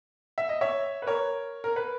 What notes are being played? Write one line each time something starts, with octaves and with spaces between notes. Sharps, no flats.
E5
D#5
C#5 E5
B4
A#4 C#5
A#4
B4